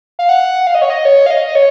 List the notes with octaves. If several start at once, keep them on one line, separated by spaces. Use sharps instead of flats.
F5
F#5
F5
D#5
C#5
D#5
C#5
F5
D#5
C#5